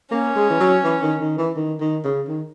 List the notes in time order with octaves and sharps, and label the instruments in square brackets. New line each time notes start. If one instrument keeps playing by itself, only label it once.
[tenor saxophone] A#3 [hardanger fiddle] C#4
[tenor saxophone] G#3
E3
F#3
E3
D#3
D#3
E3
D#3
D#3
C#3
D#3